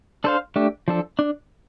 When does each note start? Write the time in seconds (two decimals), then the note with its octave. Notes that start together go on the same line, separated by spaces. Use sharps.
0.24 D4 A4 C5 F5
0.56 A3 D4 G4
0.88 F3 D4 A4
1.19 D4